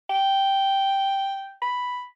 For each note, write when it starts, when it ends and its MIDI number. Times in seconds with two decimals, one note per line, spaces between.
0.10 1.54 79
1.62 2.05 83